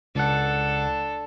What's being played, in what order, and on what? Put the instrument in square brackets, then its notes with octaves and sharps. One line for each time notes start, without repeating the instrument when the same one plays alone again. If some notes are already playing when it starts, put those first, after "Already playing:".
[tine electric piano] C#2 F#5 [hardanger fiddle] D4 A4